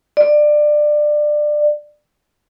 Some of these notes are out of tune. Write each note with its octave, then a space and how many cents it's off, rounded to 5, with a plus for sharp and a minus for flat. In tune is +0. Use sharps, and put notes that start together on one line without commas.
D5 +20